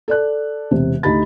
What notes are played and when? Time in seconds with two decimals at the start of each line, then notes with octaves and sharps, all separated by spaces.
0.08 A4 D5 F#6
0.71 E1 C3
1.03 D2 D#4 G4 B5 A6